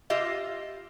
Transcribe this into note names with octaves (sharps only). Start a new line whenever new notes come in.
F4 G4 D#5 E5